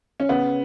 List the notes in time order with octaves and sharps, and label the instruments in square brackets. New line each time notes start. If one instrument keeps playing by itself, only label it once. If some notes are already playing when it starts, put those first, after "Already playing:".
[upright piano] C#4
C#3 B3